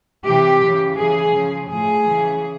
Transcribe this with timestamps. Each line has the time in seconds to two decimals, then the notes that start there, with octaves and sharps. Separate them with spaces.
0.24 C3 E3 G4
0.60 C#3 E3
0.96 C#3 E3 G#4
1.33 C#3 F3
1.69 A2 F3 G#4
2.06 C#3 E3